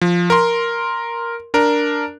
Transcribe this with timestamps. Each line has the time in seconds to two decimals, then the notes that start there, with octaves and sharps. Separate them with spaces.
0.01 F3
0.30 A#4 C6
1.54 D4 A#4